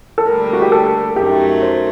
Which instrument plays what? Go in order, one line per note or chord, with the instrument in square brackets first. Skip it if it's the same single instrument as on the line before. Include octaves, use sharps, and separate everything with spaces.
[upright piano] A4
[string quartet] D2 D3 G3 A#3 [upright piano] A#4
[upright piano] F#4
G4
A4
[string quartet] F#2 D#3 F#3 A3 [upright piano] G4
[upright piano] C5